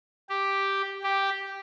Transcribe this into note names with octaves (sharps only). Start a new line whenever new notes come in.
G4
G4